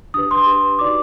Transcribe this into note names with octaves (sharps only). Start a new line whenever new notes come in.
D4 G4 B4 D#6
C6
D4 G4 B4
D#4 F#4 B4 D5 D6